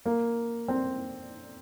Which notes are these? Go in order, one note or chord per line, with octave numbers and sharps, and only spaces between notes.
A#3
C4